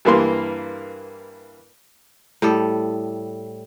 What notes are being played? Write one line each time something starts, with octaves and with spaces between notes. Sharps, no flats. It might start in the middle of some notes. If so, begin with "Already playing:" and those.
G2 E3 A#3 C6
A2 G3 A4